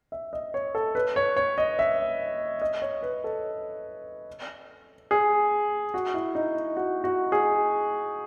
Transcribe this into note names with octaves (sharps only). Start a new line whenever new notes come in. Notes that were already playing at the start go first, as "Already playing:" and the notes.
E5
D#5
C#5
A4
B4
C#5
C#5
D#5
E5
D#5
C#5
B4
A4
G#4
F#4
E4
D#4
F#4
F#4
G#4